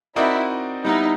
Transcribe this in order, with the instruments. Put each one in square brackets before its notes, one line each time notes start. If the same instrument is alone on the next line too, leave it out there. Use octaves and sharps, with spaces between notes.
[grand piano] C4 D#4 F#4 A#4 D5 [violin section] E4
[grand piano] G3 B3 E4 [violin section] D#4